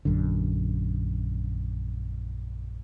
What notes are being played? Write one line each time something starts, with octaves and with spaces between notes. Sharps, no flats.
A#1 F#2 D3